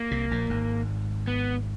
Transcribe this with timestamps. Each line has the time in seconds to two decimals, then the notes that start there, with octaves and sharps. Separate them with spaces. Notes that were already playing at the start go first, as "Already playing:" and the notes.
Already playing: A#3
0.11 C2 C3
0.31 A#1 A#2
0.49 G#1 G#2
1.27 B3